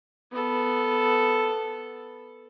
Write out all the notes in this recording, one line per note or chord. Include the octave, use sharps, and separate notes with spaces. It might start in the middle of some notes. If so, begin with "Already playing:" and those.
B3 A4